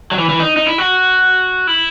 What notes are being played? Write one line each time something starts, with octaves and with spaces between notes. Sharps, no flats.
F#3
E3
E3
D#4
D#4
E4
F#4
E4